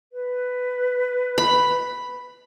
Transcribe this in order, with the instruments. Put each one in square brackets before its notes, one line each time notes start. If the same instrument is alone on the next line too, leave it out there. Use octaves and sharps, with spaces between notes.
[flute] B4
[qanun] B5